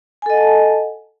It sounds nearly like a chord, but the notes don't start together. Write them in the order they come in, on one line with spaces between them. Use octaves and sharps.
G#5 A4 D#5 F#5 A5